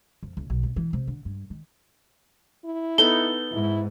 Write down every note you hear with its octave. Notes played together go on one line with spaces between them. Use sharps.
F2
C#2
B1
C3
E3
C3
D3
G2
D#3
E4
B3 D#4 A4 G7
G#2 E4